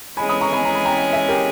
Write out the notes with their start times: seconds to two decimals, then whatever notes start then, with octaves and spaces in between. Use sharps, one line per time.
0.17 E3 G#3 C#4 G#4 G#5 B5
0.29 B5 D#6
0.41 A#5 C#6
0.53 G#5 B5
0.65 A#5
0.75 B5
0.85 G5 A#5
1.13 E5 G#5
1.29 G4 A#4